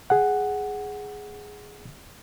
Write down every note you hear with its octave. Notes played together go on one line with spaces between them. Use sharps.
G#4 F#5